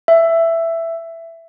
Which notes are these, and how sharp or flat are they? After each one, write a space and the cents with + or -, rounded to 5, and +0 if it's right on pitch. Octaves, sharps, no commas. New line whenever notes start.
E5 +10